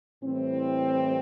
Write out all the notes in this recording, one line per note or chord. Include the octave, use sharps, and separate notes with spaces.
A2 E3 G3 C4